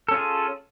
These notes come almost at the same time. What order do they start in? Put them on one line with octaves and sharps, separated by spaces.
A4 C#4 F4 G#4